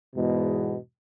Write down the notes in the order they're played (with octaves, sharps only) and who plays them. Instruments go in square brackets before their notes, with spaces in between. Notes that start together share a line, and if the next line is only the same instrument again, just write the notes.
[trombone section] E2 G#2 B2